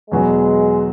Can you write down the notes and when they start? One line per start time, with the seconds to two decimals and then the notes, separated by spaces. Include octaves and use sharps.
0.11 E2 B2 F#3 G#3 B3